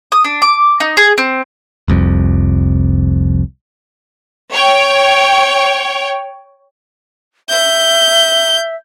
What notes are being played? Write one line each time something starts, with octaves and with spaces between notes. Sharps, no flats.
D#6
D4
D6
D#4
G#4
C4
F1 C2 F2
C#5 G5
E5 G6